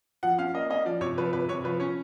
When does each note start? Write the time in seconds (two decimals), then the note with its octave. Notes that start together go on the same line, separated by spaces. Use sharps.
0.23 F3 F#5
0.38 C#4 F5
0.54 A#3 D#5
0.70 C#4 D#5
0.85 F3 D5
1.01 C3 C#5
1.18 F3 B4
1.33 C3 B4
1.48 C3 C#5
1.64 F3 B4
1.80 C#4 C#5